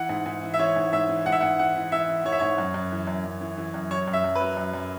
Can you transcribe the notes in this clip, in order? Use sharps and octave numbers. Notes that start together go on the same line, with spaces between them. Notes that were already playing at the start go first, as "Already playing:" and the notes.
Already playing: E3 F#5
G#2
G#2
E3
E5
E3 C#5
G#2
G#2 E5
E3
G#2 F#5
E5
G#2 F#5
E3 F#5
E3
E3 E5
E3
E3 C#5
E5
G#2 C#5
F#2
F#2
E3
F#2
F#2
E3
E3
F#2
F#3 C#5
F#2
E5
F#2
B4
F#3
F#2
F#2